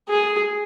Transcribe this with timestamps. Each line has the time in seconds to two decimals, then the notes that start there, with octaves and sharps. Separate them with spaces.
0.09 G#4